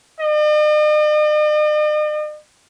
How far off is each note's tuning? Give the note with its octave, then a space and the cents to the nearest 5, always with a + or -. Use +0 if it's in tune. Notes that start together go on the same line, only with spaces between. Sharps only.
D#5 -45